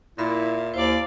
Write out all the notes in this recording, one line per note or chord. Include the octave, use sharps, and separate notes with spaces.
A#2 E4 A#4 E5 B5
D#2 E4 C5 D5 F5